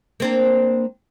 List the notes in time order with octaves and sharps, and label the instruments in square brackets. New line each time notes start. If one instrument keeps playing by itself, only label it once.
[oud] A#3 C4 D4